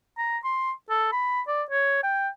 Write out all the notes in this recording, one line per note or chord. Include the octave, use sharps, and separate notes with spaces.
A#5
C6
A4
B5
D5
C#5
G5